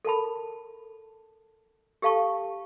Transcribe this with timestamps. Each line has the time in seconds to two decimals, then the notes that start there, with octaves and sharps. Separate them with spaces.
0.05 A4 A#4 A5 B5
2.02 G4 A4 F5 A5 C#6